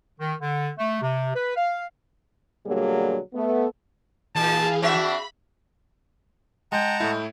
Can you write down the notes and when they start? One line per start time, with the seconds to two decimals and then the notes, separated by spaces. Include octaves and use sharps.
0.19 D#3
0.40 D3
0.78 A3
1.02 C3
1.35 B4
1.56 F5
2.66 B2 D3 F#3 G3 A#3 G#4
3.34 A3 B3
4.36 A#2 E3 G#4 F5 A5
4.82 C4 D4 F#4 E5 B5
6.72 G#3 F#5 G5 A5 A#5
7.00 A2 A3 E4 G6